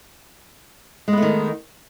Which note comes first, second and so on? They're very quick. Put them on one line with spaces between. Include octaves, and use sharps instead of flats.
G#3 B3 A3 D#3